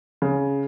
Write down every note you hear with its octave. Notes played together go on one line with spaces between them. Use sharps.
C#3